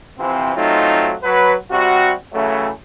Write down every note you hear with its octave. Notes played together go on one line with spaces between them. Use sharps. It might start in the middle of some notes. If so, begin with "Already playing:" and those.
C3 E3 F3 C4
F#3 A3 C4 D#4 F4
F#3 B4
C3 G3 F#4
C#3 E3 F#3 A3